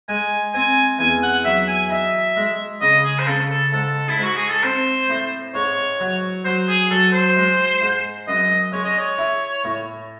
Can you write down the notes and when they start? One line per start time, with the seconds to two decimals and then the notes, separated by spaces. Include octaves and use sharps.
0.09 G#3 G#5
0.54 C4 G#5
0.99 E2 G#5
1.23 F#5
1.45 F#3 E5
1.67 G#5
1.90 D#4 E5
2.36 G#3
2.81 C#3 D#5
3.04 G#4
3.19 C5
3.27 C#3 A4
3.50 A4
3.72 G#2 A4
4.09 E4
4.18 G#2 F#4
4.36 G#4
4.49 A4
4.63 C4 C5
5.09 A2
5.54 G#2 C#5
6.00 F#3
6.45 F#3 C5
6.68 G#4
6.90 F#3 A4
7.13 C5
7.36 G#3
7.81 G#2
8.27 F#2 D#5
8.72 G#3 C#5
8.85 D#5
8.98 C#5
9.18 E4
9.64 A2